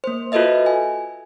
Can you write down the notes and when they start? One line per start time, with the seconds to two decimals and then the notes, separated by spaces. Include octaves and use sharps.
0.04 A#3 C5
0.32 F4 F#4 A4 B4 D#5 E5
0.66 G#5